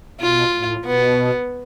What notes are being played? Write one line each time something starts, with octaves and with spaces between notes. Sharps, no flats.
B2 F4
A2
B2 B3